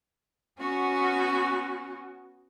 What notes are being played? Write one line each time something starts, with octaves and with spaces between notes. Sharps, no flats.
B3 C#4 F#4